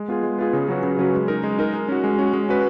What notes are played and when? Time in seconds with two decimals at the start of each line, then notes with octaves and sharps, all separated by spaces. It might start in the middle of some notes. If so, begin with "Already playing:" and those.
Already playing: G#3
0.08 B3 F4 G#4
0.23 G#3
0.38 B3 F4 G#4
0.53 C#3
0.68 F#3 C#4 F#4 B4
0.83 C#3
0.99 F#3 C#4 F#4 B4
1.14 G#3
1.28 D#4 A#4
1.44 G#3
1.59 D#4 A#4
1.74 G#3
1.89 C#4 F#4
2.04 G#3
2.19 C#4 F#4
2.33 G#3
2.49 C#4 F#4 B4